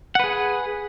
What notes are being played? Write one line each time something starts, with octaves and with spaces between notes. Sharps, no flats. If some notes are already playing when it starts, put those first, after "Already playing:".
G#4 B4 F#5